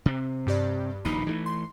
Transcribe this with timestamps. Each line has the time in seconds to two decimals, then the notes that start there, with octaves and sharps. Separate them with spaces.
0.06 C3 C4
0.47 G2 G4 D5
1.05 D#1 A#1 B2 D#4 B5
1.27 E3 F3 A3
1.46 C6